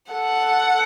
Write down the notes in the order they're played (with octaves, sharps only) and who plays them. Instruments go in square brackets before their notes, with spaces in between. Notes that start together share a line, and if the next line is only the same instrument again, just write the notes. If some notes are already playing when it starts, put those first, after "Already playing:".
[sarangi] A4 [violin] F#5